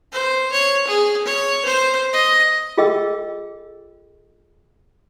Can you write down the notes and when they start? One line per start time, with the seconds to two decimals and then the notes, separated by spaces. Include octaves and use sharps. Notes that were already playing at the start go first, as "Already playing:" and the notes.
0.13 C5
0.52 C#5
0.87 G#4
1.25 C#5
1.65 C5
2.13 D#5
2.77 F4 G#4 A4 D#5 G5 E6